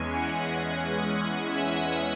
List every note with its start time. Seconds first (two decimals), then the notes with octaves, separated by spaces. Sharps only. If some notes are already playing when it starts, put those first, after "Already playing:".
Already playing: E2 E3 G#3 C#4 G#5
0.11 F#5
1.45 E5
1.74 F#5